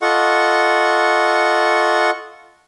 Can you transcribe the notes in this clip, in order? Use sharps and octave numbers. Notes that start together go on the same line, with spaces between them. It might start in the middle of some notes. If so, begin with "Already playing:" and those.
F4 A4 D#5 F#5 C#6